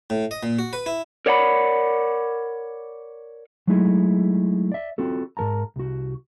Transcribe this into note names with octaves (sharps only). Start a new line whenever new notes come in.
A2
D#5
A#2
F#4
B4
E4
A#4 C#5 D5 F#5 G5 B5
F#3 G#3 A3 D#4 E4 G#4
D5 E5
C4 F4 F#4 A4
G#2 C#3 A#4 A5 A#5
C2 F#4